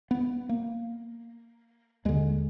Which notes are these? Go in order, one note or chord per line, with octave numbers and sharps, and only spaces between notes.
B3
A#3
D#2 D3 G#3